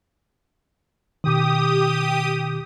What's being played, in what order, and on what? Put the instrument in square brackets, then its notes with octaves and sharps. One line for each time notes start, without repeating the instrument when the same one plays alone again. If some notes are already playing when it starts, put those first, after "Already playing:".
[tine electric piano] B2 D#3 [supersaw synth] G4 D#6